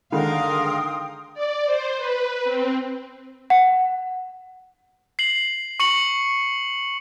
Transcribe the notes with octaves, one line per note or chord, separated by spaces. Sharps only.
D3 D#3 G#3 A#4 F5 G5 C6 D#6
D5
C5
B4
C4
F#5
C7 F#7
C#6 C#7 F#7